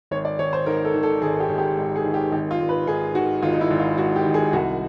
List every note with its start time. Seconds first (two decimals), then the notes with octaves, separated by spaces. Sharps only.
0.11 G#1 C#5
0.25 D5
0.39 G#1 C#5
0.53 C5
0.66 G#2 A#4
0.85 A4
0.94 D#3
1.03 A4
1.22 G#1 G#4
1.40 G4
1.49 G#1
1.58 G4
1.77 G#2
1.96 G#4
2.04 D#3
2.14 G4
2.32 G#1 G4
2.51 F4
2.60 G#1
2.69 B4
2.87 G#2 G#4
3.15 D#3 F#4
3.42 G#1 F4
3.53 D#4
3.61 E4
3.70 G#1
3.80 F4
3.98 G#2 F#4
4.16 G4
4.25 D#3
4.34 G#4
4.53 C2 F#4